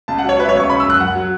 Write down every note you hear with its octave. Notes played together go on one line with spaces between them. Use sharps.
C#2 A5
F#5
F#3
C#5
F#3 B4
E5
C#5
C#2
C#6
C#3 B5
E6
F#2 F#6
F#2 F#5
F#3